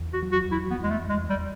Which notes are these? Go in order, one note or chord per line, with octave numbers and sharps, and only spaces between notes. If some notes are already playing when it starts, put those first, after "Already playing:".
Already playing: E2
F#4
F#3
F#4
E2 E4
B3
E2 G#3
A3
E2 G#3
G3